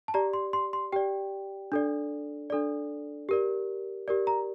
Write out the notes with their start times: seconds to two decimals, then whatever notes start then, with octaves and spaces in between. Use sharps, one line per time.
0.08 A5
0.14 G4 D5 A#5
0.33 C6
0.53 C6
0.73 C6
0.92 G4 D5 G5
1.72 D4 A4 D5
2.50 D4 A4 D5
3.29 G4 A#4 D5
4.08 G4 A#4 D5
4.27 A#5